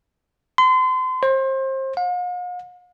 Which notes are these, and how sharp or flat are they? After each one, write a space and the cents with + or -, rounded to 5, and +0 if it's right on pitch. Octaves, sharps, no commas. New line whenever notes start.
C6 -35
C5 +30
F5 +45